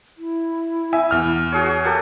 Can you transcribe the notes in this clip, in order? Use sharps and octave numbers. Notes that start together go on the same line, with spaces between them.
E4
E5 G#5
E2 F6
F#4 G#4 C#5
A#3 G4 A4